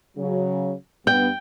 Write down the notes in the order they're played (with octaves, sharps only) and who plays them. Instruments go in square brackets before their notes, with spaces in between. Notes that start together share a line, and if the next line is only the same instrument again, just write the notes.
[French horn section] C#3 F#3
[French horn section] G2 B3 [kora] G5